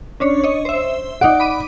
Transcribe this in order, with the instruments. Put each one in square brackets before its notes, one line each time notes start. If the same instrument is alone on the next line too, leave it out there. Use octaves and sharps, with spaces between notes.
[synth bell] C#4 D4 C#5
C#5 D#5
C5 E5
[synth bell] D#4 D5 D7 [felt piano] F#5
[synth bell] B5 D6 D#7